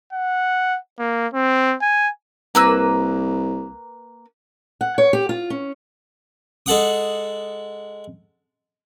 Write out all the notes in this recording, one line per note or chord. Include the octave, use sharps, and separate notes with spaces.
F#5
A#3
C4
G#5
C2 A#3 B4 E6
F#5
C#5
G4
F4
C#4
G#3 A4 F#5 D#6